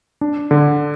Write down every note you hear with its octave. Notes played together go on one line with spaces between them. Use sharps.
D4
D3